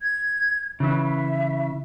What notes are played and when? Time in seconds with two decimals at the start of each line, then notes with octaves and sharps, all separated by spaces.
0.01 G#6
0.80 C#3 E3 E5